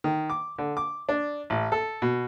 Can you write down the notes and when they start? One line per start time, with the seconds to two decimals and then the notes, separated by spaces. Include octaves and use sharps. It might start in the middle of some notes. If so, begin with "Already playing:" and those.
0.04 D#3
0.30 D6
0.58 D3
0.77 D6
1.09 D4
1.50 A1
1.72 A4
2.02 B2